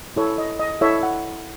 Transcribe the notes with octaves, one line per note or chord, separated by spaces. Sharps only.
E4 A4 C#5
D#5
D#5
E4 A4 C#5 E5
F#5